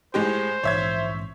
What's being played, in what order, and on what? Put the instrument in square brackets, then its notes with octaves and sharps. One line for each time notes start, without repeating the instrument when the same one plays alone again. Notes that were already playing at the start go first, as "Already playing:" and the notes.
[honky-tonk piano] A2 G#3 G4 [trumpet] C5
[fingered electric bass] A#1 G#2 E3 [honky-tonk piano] C#5 E5 G#6